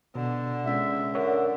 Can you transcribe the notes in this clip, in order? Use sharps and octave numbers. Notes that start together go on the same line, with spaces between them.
B2 D3
C#2 E5
D3 A#4 C#5 E5 F#5